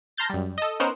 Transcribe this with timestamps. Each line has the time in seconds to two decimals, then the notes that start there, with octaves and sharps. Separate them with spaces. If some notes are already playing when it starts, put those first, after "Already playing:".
0.18 A5 A#5 C6 F6 G6 A6
0.30 F#2 G3
0.58 A4 D#5
0.80 B3 C#4 D#4 A#4 C5 F#5